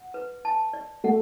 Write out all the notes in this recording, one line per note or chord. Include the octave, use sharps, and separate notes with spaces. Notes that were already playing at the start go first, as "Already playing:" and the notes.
Already playing: F#5
B4
A5
D5
A3 F#5